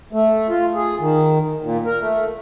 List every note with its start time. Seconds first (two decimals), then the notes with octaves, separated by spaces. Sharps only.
0.13 A3
0.49 F4
0.75 G#4
1.00 D#3
1.63 A#2
1.86 A#4
2.01 A3